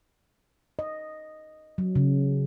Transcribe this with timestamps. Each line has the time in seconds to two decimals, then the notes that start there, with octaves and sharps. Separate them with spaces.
0.79 D#5
1.78 F#3
1.95 C#3